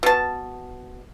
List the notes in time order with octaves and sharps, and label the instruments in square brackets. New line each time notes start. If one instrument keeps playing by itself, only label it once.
[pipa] B2 A5